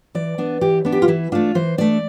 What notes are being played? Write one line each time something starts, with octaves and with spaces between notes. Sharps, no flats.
E3 D5
B3 D4
E3 G4
B3 D4
G4
F4
E3 E4
A3 D4 F4
E3 C5
A3 D4 D5